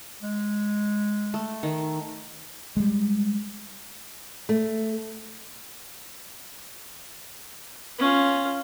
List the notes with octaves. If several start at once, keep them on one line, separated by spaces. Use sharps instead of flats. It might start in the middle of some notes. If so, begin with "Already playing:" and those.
G#3
A3
D#3
G3 G#3
A3
C#4 F4